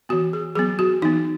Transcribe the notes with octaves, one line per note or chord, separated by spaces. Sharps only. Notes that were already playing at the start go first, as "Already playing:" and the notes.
E3 B3 F#4
G#4
F#3 B3 G#4
F#4
E3 B3 D#4